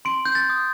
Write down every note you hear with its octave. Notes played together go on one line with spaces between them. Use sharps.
C6 D7
G6
A6
D#6